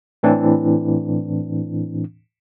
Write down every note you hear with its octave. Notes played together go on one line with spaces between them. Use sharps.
A2 E3 C4 D4